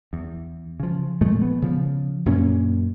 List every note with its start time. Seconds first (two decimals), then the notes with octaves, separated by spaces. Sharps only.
0.13 E2
0.80 C#3 F3
1.21 A#2 F3 G#3 A3
1.42 B3
1.62 C#3 F3
2.26 F#2 A#2 A#3 C#4